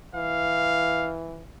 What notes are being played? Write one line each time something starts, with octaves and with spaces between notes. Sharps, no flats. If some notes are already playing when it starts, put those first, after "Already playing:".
E3 F5